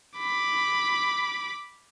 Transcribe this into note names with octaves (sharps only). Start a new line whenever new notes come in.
B5 D6